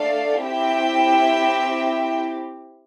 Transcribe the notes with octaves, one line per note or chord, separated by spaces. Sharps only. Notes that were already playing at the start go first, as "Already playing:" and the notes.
Already playing: A3 D4 A4 D5 F5
C4 E4 G4 E5 G5